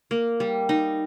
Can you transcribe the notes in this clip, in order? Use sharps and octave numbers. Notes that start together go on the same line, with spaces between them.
A#3
G3
D#4